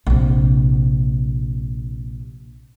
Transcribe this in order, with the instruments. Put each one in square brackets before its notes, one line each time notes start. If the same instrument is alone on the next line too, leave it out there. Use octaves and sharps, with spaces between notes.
[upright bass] A#1 C3